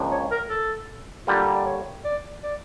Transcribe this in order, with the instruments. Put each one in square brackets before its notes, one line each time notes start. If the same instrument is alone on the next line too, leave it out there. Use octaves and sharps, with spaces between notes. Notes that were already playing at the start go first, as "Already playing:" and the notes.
Already playing: [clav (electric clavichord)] C#2 C#3 F3 A#3 D4
[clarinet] C#5
A#4
A4
[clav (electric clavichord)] D3 G3 A#3 [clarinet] F4
[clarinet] D5
C#5
D5
D5